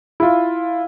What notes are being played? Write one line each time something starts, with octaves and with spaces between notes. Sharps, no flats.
E4 F4